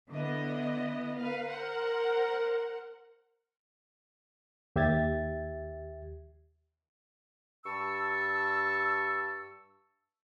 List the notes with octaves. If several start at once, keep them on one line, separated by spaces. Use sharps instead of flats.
D3 B3 E4 D#5
A#4 B4 F5
A#4 C5 F#5
D#2 G4 E5 G#6 A6
G2 A5 C#6 E6